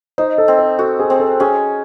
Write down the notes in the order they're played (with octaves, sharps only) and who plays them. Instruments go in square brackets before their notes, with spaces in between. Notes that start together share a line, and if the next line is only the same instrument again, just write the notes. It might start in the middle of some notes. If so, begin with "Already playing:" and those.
[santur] D#4 [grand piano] C5
[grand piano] A4
[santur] C4
[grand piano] C5
[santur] F#4 [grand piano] A4
[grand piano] G#4
[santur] C4
[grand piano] A4
[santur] C#4 [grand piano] G#4